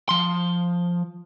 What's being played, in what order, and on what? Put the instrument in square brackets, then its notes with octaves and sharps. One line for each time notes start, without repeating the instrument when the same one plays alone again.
[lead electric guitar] F3 C6